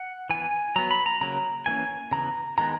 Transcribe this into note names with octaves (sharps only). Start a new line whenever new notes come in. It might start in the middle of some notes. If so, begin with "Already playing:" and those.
Already playing: F#5
E3 B3 G#5
F#3 B3 A#5
B5
A#5
C#3 F#3 A#3 A#5
E3 A#3 C#4 G#5
C#3 E3 B3 A#5
D#3 G#3 B3 A#5